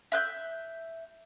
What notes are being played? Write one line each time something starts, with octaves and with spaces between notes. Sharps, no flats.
E5 F#6 G6